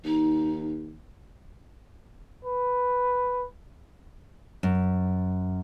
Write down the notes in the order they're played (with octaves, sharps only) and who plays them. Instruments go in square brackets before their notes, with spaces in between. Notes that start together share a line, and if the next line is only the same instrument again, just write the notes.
[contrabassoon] D#2 [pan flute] D#4
[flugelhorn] B4
[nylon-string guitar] F#2